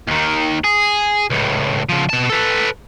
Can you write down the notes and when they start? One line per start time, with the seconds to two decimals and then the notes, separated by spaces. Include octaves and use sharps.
0.07 D#2 D#3
0.64 G#4
1.30 C#2 A2
1.89 C#3 F3
2.09 B2 A5
2.30 A4 B4